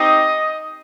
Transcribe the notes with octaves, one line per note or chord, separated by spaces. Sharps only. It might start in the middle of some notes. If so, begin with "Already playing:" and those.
Already playing: C4 D#4 G4 D#5